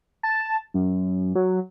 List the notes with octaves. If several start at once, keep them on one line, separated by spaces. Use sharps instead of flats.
A5
F#2
F#3